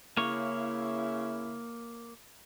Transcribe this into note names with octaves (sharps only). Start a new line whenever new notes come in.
C#3 A#3 E4 C#5